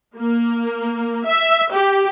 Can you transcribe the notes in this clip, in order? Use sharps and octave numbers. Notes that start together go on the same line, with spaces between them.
A#3
E5
G4